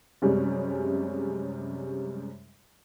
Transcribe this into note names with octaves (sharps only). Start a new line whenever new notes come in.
F#2 C3 G3 G#3 C#4